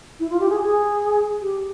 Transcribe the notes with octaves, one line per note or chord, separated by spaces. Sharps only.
E4
F4
G4
G#4
G#4
G4